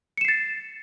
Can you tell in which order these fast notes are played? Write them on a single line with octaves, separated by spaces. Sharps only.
C#7 E7 C7 A6